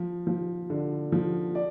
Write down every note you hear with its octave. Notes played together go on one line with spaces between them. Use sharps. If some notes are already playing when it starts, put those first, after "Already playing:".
Already playing: F3
F3
D3
F3
D5